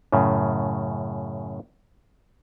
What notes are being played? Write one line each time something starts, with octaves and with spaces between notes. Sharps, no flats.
F#2 A2 C#3